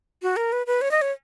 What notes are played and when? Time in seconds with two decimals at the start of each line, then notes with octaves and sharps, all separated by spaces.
0.22 F#4
0.36 A#4
0.52 B4
0.67 B4
0.81 C#5
0.91 D#5
1.01 C#5